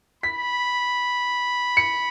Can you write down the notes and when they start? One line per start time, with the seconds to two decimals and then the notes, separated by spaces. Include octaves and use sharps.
0.23 B5 B6
1.77 C#7